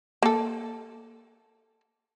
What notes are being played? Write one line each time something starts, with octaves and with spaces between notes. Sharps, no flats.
A#3 A4